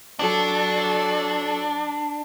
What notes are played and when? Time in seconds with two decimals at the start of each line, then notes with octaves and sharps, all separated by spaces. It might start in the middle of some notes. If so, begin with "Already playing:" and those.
0.19 F#3 D4 A4